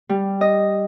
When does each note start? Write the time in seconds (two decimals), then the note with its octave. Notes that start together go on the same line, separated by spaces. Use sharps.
0.09 G3
0.41 D#5